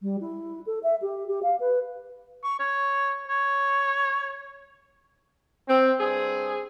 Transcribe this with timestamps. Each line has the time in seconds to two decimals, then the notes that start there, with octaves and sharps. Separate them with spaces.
0.02 G3
0.21 E4
0.67 A4
0.83 E5
1.02 G4
1.28 G4
1.43 F5
1.60 B4
2.44 C#6
2.60 C#5
3.28 C#5
5.68 C4
6.00 G2 C4 G#4